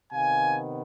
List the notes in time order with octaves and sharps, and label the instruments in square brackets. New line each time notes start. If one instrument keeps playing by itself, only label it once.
[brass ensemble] C3 D#3 B3 F5 G#5